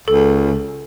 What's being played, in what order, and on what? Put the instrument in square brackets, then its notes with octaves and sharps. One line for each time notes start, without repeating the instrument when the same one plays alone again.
[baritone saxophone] C#2 [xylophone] A4